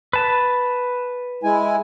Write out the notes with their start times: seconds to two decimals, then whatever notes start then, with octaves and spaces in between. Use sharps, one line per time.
0.13 B4 A5
1.43 G#3 E4 G#5